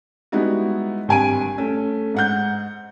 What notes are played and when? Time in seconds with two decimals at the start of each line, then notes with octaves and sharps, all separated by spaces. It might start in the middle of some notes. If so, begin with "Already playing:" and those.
0.32 G3 G#3 B3 D#4 E4 F#4
1.08 G#1 G2 G#5 D7 D#7
1.58 A3 C#4
2.14 G#2 F#5 G6